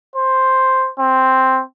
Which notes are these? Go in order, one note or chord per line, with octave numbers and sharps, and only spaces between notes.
C5
C4